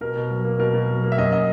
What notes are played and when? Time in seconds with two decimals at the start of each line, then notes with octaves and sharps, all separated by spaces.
0.01 B2 A#4
0.15 B2
0.30 F#3
0.45 A#3
0.59 B2 A#4
0.74 B2
0.89 F#3
1.03 A#3
1.12 E5
1.18 F#2 D#5
1.32 D#5